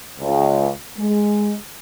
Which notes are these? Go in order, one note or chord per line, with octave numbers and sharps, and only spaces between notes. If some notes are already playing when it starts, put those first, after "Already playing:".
C#2
G#3